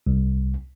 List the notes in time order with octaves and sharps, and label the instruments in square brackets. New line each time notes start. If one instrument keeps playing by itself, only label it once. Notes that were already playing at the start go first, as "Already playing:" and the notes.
[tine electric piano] C2